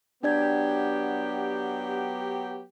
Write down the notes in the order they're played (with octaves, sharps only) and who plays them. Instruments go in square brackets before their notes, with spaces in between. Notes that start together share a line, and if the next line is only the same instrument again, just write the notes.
[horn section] F#3 B3 G4 [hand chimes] D4 D5 G#6